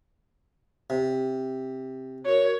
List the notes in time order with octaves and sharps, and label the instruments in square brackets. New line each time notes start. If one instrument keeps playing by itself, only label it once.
[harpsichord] C3
[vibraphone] F#4 A#4 [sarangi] C#5